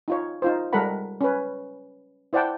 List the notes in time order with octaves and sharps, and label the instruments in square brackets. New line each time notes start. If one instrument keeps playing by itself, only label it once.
[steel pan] D#4 F4 C#5
D#4 F4 C5
G3 G#3 A4 A#4 F#5 B5
C#4 B4
E4 C5 D5 F#5 G5 A5